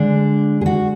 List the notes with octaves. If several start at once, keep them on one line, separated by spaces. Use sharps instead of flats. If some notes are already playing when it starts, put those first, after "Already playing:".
Already playing: D3 G#3 D4
G#4
F#4